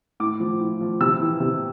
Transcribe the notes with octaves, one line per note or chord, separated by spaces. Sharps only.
A2 D6
F3
A2
F3
C3 E6
E3
C3